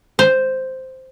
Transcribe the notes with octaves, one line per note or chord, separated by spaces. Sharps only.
C5